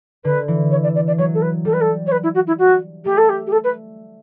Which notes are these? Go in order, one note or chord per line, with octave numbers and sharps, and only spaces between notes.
D3 B4
E3
C#5
D5
D5
D5
F#3 C#5
A4
B4
G3 A4
B4
A4
C#5
B4
E4
F#4
E4
F#4
A3 G4
A4
G4
G4
A4
B4